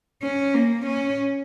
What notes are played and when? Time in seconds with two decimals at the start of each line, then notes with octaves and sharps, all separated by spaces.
0.23 C#4
0.54 A#3
0.86 C#4